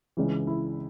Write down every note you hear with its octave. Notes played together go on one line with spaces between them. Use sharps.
C#2 C#3 E3
E4